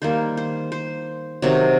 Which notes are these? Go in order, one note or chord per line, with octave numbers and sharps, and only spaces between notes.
D#3 G3 A#3 C5
C5
C5
C3 D#3 F#3